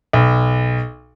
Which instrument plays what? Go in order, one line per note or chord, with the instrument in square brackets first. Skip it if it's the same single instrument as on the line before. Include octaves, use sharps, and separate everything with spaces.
[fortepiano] B1